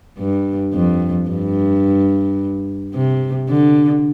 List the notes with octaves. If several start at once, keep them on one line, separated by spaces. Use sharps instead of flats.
G2
F2
G2
C3
D3